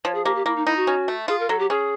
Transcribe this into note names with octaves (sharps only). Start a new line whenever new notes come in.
F3 C#5
G#4
A#3 G4
G4
A#3 E4
D#4
D#4 E4
F#4
C#4
A3
F4 G#4
A#4
F#3 A4
G4
C#4 G#4